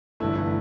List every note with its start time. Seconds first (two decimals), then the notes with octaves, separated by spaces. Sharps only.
0.20 G1 G2 E3 A3 E4
0.35 E4